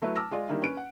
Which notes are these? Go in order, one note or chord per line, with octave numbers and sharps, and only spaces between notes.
F#3 A3 E4 B4
A5 D6 E6 F6 A#6
G#3 F4 D5
D#3 G3 A#3 D4 E4
C#4 B4 D7
F#5